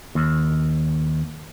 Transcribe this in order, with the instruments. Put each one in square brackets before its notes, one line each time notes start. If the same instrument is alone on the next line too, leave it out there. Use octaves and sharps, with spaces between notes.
[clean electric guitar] D#2